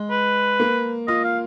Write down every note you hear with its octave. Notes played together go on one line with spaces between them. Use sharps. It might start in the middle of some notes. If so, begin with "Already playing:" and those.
Already playing: G#3
B4
A#3
F4 D#5
F5